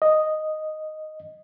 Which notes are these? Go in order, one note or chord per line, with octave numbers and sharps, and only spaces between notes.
D#5